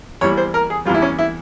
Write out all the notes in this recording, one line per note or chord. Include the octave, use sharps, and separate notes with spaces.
E2 E3 G3 C#5
C5
A#4
G#4
E2 E3 G3 F4
E4
C#4
E4